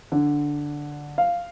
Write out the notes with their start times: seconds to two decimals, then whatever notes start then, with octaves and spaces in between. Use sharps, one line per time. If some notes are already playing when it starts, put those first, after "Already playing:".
0.12 D3
1.18 F5